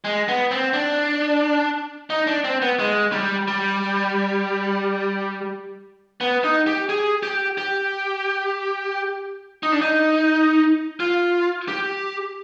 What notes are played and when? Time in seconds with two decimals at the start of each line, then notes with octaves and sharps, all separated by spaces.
0.05 G#3
0.28 B3
0.51 C4
0.74 D4
2.10 D#4
2.27 D4
2.44 C4
2.62 B3
2.79 G#3
3.12 G3
3.48 G3
6.21 B3
6.44 D#4
6.67 G4
6.89 G#4
7.23 G4
7.58 G4
9.63 D#4
9.72 D4
9.81 D#4
11.00 F4
11.68 G4